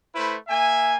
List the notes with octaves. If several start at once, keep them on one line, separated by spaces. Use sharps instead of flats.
A3 E4 B4 C5
A#3 E5 G#5